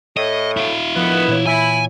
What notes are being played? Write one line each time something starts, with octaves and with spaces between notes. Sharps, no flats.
A2 D#5
E4 F5
A2 D#3 F3 B3
A#2 E3 C#5
E4 G#5